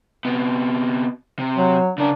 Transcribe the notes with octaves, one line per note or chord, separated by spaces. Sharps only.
C3 B3
C3
F#3
C#3 D4 A#4